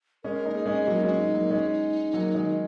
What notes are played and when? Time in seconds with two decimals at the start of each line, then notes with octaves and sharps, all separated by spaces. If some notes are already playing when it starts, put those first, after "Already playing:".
0.23 G#3 C#4 A#4
0.45 A#3 D#4
0.55 G#4
0.66 G#3 C#4
0.87 F#3 A#3 F#4
0.96 D#4
1.03 G#3 C#4 F#4
1.18 D#4
1.34 F#3 A#3
1.51 G#3 C#4
2.13 F#3 A#3
2.34 D#3 G#3